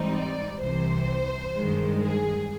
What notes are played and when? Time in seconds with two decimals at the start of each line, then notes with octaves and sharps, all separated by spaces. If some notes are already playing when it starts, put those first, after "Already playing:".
Already playing: G#2 E3 G3 C4 D#4
0.15 D5
0.61 C2 C3 E3 C5
1.55 G2 D#3 G#3
2.02 G#4